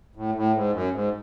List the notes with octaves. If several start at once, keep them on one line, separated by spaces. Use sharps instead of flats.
A2
A2
G#2
F#2
G#2